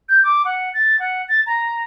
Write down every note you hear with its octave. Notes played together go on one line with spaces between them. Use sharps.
G6
D6
F#5
A6
F#5
A6
A#5